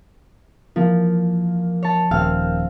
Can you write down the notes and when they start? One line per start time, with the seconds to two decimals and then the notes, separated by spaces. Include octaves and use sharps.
0.76 E3 F3 A#3 F4
1.83 C#5 A5
2.11 D#1 C4 A#4 F5 G5 E6